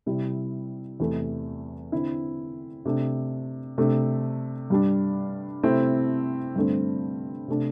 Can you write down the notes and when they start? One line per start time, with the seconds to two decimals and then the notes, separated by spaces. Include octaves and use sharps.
0.06 C3 G3 E4
1.00 E2 C3 A3
1.92 D3 C4 E4
2.85 C3 A3 D4
3.78 C3 A3 D4
4.70 G2 G3 D4
5.63 C3 A3 C4 E4
6.56 G2 D3 A3 C4
7.48 C3 A3 D4